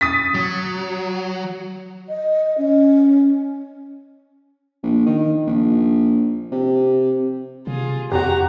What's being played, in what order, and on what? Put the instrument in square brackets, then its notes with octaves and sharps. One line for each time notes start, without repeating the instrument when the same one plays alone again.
[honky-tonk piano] D#6 A6 B6
[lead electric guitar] F#3
[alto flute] D#5
C#4
[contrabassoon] A#1
D#3
A#1
C3
[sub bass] C3 [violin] F4 G#4
[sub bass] F2 [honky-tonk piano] F#4 G4 [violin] A#5